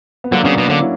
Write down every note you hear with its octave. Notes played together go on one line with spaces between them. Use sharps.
B3
D3 F#3 A#3
C#3 B3 D4
B2
D3 A#3 C#4
C#4 E4